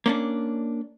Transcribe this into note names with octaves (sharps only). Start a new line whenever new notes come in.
A#3 C#4 D4